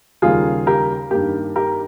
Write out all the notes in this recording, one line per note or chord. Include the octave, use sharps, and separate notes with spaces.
D#2 C#3 G3 A#3 F4 G#4
G4 A#4
G2 D#3 A#3 G4
G4 A#4